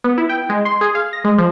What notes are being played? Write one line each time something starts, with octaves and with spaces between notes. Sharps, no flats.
B3
E4
G5
G#3
C6
G#4
F5
A#6
G#3
F3